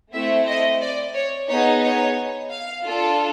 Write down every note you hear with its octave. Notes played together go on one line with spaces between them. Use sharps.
A3 C4 E4 E5
D#5
D5
C#5
B3 D#4 G#4 C#5
C#5
F5
D4 F4 A4